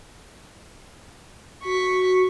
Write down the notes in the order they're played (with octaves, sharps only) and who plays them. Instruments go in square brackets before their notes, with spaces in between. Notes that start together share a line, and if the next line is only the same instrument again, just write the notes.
[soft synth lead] F#4 [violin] C#6 B6